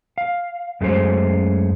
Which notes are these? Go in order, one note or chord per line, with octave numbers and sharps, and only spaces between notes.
F5
F#2 G#3 A3 C#4 C5